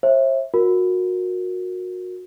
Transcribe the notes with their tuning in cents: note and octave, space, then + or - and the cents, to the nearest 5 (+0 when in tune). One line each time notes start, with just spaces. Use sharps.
C5 +45 E5 +0
F#4 -25 A#4 +0